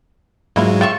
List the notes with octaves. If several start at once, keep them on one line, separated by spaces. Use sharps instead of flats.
G#2 F#3 G#3 A#3 E4 F4
F4 E5 G5 C#6